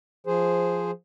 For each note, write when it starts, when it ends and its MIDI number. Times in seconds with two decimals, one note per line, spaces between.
0.27 0.91 53
0.27 0.91 68
0.27 0.91 72